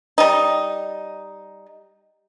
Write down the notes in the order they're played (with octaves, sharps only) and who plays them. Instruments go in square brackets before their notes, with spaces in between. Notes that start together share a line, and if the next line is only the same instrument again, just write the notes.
[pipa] G3 D#4